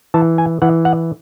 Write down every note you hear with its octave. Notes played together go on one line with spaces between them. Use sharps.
E3 A5
G#5
E3 F#5
F#5